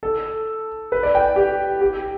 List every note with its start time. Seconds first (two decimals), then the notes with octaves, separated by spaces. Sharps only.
0.03 A4
0.92 B4
1.03 D5
1.15 G5
1.36 G4
1.81 G4